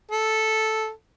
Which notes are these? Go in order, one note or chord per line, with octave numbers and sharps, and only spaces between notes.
A4